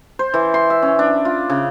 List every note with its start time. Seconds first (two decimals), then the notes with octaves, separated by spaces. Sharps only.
0.19 C5
0.34 E3
0.54 C6
0.70 E5
0.82 C#4
0.99 D4
1.25 F4
1.50 C#3